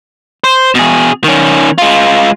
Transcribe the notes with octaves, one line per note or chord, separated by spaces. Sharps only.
C5
B2 G#4
D#3 C#4
G#3 F4